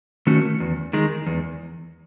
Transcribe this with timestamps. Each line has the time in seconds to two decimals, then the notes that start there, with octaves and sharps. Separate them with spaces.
0.27 D#3 A3 C#4 F#4
0.60 E2
0.93 D#3 G#3
1.27 E2